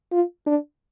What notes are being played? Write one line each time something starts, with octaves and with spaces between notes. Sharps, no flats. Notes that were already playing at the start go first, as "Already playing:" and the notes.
F4
D4